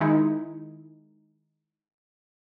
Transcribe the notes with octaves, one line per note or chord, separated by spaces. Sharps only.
D#3 G#3 D#4 E4